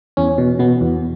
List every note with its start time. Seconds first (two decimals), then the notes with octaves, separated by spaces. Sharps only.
0.17 E2 C#4
0.38 B2
0.59 B2 B3
0.81 E2